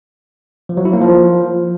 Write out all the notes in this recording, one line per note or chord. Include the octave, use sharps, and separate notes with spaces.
F3
F#3
E4
A#3
F3